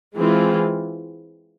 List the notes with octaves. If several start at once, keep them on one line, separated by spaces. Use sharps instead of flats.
E3 G#3 C4 F4